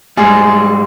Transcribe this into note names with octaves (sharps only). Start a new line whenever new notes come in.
G#2 G3 G#3 G#4